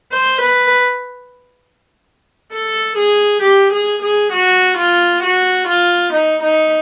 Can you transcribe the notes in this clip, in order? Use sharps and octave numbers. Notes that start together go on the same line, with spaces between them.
C5
B4
A4
G#4
G4
G#4
G#4
F#4
F4
F#4
F4
D#4
D#4